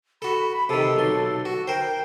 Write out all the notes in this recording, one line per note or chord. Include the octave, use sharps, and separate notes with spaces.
F#4 A4 B5
B5
C3 D#3 A4
B1 C6
F#4
A#4 C5 G5